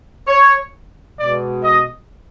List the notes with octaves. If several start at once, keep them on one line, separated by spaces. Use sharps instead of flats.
C#5
B2 G#3 D5
D#5